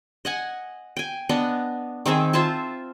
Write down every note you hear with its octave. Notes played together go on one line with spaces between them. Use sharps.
D#5 F#5 G#5
G5 G#5
B3 D4 D#5
D#3 C4 G#4 E5
F4 C5 E5 A5